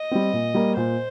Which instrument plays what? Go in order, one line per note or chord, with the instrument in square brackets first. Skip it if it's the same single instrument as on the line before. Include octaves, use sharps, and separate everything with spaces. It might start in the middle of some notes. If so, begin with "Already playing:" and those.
Already playing: [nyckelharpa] D#5
[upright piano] G3 C4
A#2
G3 A#3
[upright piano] A#2 [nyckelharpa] C5